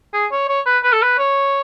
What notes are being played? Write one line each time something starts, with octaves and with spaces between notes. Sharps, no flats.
G#4
C#5
C#5
B4
B4
A4
B4
C#5